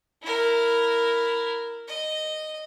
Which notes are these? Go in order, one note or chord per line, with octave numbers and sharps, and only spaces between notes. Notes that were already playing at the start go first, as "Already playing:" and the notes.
E4 A#4
D#5